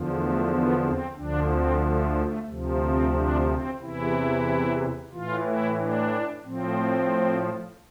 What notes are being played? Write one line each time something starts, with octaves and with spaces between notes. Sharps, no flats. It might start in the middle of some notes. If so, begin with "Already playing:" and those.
Already playing: E2 D3 F3
A3
B3
C4
D2 D3 F3 D4
C4
A3
A3
D2 C3 F3
C4
D4
C4
E2 C3 E3 E4
A2 E3 F4
E4
D4
A2 F3 C4